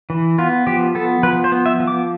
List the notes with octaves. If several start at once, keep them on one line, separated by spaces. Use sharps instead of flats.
E3
B3 F4
F3 G4
B3 A4
F3 B4
C5
B3
E5
F3
D6